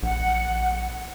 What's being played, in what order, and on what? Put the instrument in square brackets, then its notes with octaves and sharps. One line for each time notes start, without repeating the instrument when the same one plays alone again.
[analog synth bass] A#1 [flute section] F#5